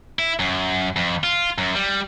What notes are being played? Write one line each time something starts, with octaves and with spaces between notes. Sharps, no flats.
E4
F#2
F2
F4
F#2
G3